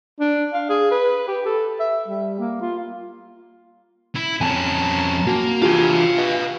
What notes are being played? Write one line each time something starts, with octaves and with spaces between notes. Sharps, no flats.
D4
F5
G#4
B4
G4
A4
E5
G3
A#3
F4
E4
F2 C#4 G#5 A5
A#3 F#4
E3 D4 F4 G4 F5 G#5
B4 D#5